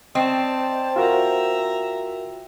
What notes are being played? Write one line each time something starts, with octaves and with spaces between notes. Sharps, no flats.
C4 C5 D5 D#5 A5
F4 F#4 A#4 E5 A#5